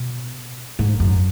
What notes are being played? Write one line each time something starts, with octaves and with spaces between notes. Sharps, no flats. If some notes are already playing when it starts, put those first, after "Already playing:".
Already playing: B2
G#2
F#2